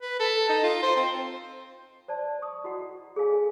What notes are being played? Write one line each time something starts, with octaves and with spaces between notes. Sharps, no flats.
B4
A4
D#4
F4
C5
C4
C5 D5 A5
C#6 D#6
E4 F#4 D#5 F#5
G#4 A4 C#5 D#5 F5 G#5